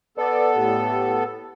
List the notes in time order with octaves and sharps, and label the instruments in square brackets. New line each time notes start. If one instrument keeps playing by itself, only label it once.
[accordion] B3 A4 [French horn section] B4 D5
[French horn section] A2 G4